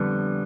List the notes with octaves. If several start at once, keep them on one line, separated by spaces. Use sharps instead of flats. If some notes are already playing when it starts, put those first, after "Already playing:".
Already playing: F2 D3 G3 B3